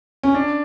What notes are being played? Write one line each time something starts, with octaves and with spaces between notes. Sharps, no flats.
C#4
D4